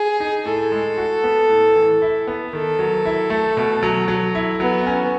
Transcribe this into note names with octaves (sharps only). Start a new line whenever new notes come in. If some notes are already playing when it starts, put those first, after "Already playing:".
Already playing: G#4
D#4
A2 A4
G#3
F#4
B3
A2
E3
E4
B3
D#3 A4
F#3
E4
A3
B2
F#3
F#3
E4
F#3 B3
C#4